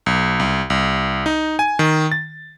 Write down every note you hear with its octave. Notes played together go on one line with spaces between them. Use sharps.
B1
C2
C2
D#4
G#5
D#3
A6